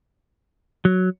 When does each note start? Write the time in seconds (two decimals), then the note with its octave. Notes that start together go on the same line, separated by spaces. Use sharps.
0.85 F#3